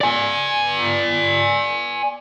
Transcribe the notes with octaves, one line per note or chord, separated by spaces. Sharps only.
D5 G#5